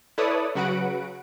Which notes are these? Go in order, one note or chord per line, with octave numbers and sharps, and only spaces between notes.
E4 A4 B4 C#5 D5 D#6
C#3 F#3 F#4 B4 F#5 D7